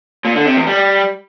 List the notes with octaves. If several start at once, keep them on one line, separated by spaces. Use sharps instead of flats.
A#2
D3
C3
E2
G3